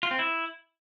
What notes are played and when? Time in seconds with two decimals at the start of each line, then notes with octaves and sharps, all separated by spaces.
0.03 F4
0.11 C4
0.19 E4